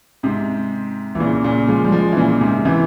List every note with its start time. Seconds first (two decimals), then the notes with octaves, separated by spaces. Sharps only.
0.23 G#2 C3
1.15 E3
1.20 A#2 C#3
1.44 A#2 C#3
1.68 F3 G#3
1.84 G3
1.92 F3 G#3
2.13 E3
2.17 A#2 C#3
2.41 G#2 C3
2.65 C3 E3